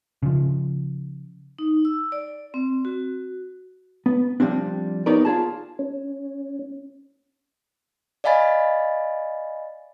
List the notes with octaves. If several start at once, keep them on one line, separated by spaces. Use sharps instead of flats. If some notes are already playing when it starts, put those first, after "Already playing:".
C#3 F3
D#4
E6
D5
C4
F#4
B3
F3 G3 C4 D4
B3 D#4 G4 A#4 C#5 D5
F4 G#4 A5
C#4
D5 D#5 F5 G#5 B5 A6